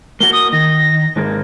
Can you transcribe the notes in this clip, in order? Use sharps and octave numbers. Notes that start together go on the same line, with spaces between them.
A#3 F#4 G7
D#6
D#3 A#6
G#2 D#3 A#3